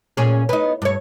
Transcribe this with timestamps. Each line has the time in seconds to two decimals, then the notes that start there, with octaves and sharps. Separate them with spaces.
0.17 A#2 C#4 G#4
0.49 B3 D#4
0.82 G2 C#5